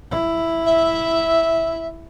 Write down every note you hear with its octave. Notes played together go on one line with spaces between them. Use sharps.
E4
E5